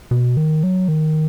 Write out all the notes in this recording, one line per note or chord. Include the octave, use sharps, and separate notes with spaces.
B2
D#3
F#3
D#3